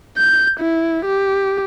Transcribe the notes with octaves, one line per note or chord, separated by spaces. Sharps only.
G6
E4
G4